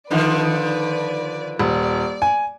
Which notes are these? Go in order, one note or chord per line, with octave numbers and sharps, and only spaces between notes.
D3 D#3 F3 B4 D5
D#1 D5
G#5